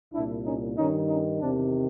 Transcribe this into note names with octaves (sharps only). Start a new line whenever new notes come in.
C2 A#2 D4 E4
C#4 D#4
G2 D#3 C#4 D#4
C#4 D#4
E2 C3 D#3 C4 D4